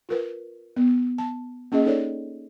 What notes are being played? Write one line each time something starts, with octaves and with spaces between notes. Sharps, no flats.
F4 A#4 B4
B3
A5
A#3 C#4 G#4 D#5
D#4 A4 C#5 D5